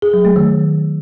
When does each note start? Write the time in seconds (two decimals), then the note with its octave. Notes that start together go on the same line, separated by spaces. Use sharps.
0.02 G#4
0.14 F#3
0.25 A3
0.36 D#3